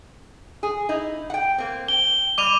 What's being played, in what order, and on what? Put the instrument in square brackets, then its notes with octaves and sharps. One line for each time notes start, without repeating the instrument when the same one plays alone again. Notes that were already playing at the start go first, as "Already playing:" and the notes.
[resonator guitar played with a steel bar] G#4
D#4 E4
F#5 G5
A#3 C4
[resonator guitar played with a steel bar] G5 [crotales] G7
[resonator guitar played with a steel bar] G3 [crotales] D6 D#7 F7